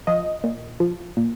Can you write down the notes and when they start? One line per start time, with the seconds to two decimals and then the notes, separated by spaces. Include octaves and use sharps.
0.07 F3 D#5
0.44 A#2
0.80 F3
1.17 A#2